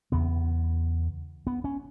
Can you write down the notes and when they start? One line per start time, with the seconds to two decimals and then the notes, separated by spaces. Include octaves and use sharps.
0.12 E2 C#3 B3
1.47 B3
1.64 C#4